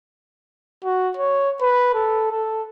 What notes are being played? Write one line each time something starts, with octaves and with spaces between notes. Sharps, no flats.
F#4
C#5
B4
A4
A4